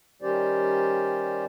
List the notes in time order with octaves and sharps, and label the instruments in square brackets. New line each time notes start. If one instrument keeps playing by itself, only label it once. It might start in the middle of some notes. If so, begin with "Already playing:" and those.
[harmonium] D#3 G3 C#4 G4 C5 D5